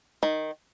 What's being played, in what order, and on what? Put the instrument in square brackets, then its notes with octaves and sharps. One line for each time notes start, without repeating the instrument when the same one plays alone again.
[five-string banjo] D#3